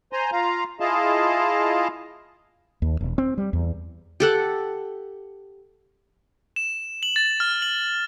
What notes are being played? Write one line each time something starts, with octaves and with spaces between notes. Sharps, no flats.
C5 G#5 A#5 C6
F4 F5 A#5
E4 F4 G#4 D#5 F5 A5
D#2
E1
C4
G3
E2
G4 A4 F#5
E7
F#7
A6
F6
F#7